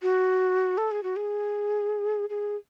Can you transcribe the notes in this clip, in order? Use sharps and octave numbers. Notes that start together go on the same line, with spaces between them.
F#4
A4
G#4
F#4
G#4
G#4